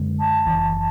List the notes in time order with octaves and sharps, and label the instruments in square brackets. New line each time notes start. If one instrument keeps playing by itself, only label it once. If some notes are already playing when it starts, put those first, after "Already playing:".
Already playing: [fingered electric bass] F#2 D3 G#3
[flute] A5
[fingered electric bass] F#1 F#2 E3